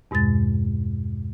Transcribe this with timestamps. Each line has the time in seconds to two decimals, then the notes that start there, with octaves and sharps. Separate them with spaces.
0.11 E2 G2 B2 G#3 A6